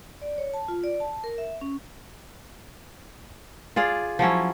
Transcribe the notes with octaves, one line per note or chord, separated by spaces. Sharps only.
D5
C#5
A5
F4
D5
A5
A#4
E5
C#4
F4 G#4 D5 F5
F3 F#3 C#4 E4